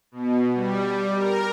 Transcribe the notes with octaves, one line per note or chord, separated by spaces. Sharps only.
B2
G3
A#4